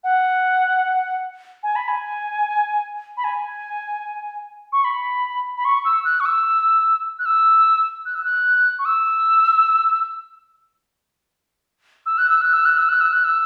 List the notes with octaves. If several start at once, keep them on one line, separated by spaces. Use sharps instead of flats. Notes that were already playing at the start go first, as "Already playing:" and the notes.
F#5
G#5
B5
G#5
B5
G#5
C#6
B5
B5
C#6
E6
F#6
C#6
E6
F#6
E6
F#6
E6
F#6
C#6
E6
E6
F#6
E6
F#6
E6
F#6
E6
F#6
E6
F#6
E6